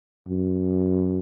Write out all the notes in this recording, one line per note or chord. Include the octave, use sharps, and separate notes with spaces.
F#2